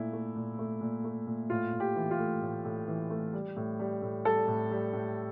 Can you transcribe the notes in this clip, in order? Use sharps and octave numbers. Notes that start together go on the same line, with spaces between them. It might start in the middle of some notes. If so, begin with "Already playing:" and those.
Already playing: A#2 A3 E4
A3
A#2
A3
A#2
A3
A#2
A2 F4
A2
G4
E3
F4
A3
A2
A2
E3
A3
G3
A2
G3
A2
G3 A4
A2
G3
A2